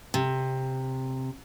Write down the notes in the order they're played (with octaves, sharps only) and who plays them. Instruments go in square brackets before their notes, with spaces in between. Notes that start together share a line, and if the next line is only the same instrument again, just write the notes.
[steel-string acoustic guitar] C3